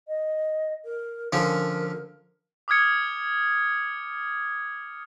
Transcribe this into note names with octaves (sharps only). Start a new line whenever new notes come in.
D#5
A#4
D3 F3 C#4 A#4
D6 D#6 F6 G#6 C#7